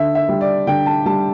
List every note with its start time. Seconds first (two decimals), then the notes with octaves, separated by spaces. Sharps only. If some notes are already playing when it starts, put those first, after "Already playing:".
Already playing: D3 E5
0.15 E5
0.29 G3
0.41 D5
0.67 D3 G5
0.86 A5
1.06 G3 A5